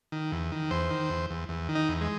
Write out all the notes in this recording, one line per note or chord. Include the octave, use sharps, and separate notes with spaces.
D#3
E2
D#3
E2 C5
D#3
E2
E2
E2
D#3
D#4
E2
G#3